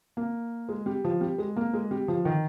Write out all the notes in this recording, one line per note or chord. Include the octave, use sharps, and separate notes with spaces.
A#3
G#3
G3
F3
G3
G#3
A#3
G#3
G3
F3
D#3